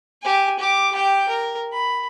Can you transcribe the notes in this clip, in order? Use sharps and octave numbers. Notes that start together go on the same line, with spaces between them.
G4 G#5
G4 D6
G4 G5
A#4
B5